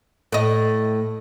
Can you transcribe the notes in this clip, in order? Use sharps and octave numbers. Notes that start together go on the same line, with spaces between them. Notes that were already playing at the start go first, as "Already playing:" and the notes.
A2 D#5